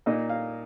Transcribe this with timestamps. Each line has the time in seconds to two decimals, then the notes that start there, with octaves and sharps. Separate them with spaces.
0.06 A#2 A#3 D#4 D#5
0.29 F5